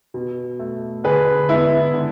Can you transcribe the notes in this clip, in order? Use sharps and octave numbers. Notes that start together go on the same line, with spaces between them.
B2
A3
D3 G#4 B4
G#3 B3 E4
D3